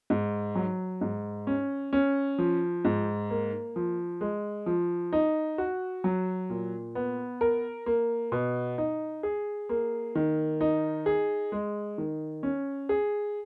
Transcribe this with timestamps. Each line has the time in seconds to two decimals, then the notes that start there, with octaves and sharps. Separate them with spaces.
0.10 G#2
0.55 F#3
1.01 G#2
1.47 C#4
1.93 C#4
2.38 F3
2.85 G#2
3.30 A#3
3.76 F3
4.21 G#3
4.66 F3
5.13 D#4
5.58 F#4
6.04 F#3
6.50 A#2
6.95 B3
7.41 A#4
7.86 A#3
8.32 B2
8.78 D#4
9.23 G#4
9.69 A#3
10.15 D#3
10.61 D#4
11.06 G#4
11.52 G#3
11.98 D#3
12.43 C#4
12.89 G#4